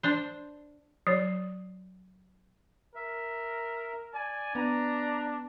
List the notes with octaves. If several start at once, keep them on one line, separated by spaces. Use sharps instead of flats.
D4 C5
F#3 C#5
A#4 E5
D5 G#5
B3 D4 A#5